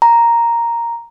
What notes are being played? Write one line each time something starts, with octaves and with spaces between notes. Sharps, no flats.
A#5